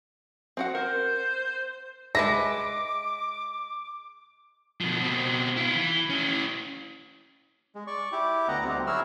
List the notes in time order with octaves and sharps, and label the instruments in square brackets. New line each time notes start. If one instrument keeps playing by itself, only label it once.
[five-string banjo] C4 F#4 F#5
[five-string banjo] A#4 [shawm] C5
[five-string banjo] G#3 B4 E5 [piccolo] D6 [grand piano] A#6
[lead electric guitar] B2 F3
B2 C4
E4 F4
E3
C#4 E4
[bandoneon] G#3
D5 C#6
E4 G4 D6
D2 B3 D#5 F#5 A#5
D2 G3 C4
F#3 E4 F#4 G#4 E6 F6